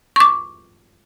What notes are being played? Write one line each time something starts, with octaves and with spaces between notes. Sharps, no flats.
C#6 D6